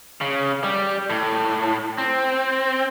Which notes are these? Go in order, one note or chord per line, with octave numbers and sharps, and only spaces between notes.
C#3
G3
A2
C4